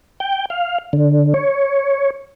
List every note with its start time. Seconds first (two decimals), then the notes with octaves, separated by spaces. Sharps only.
0.20 G5
0.50 F5
0.93 D3
1.34 C#5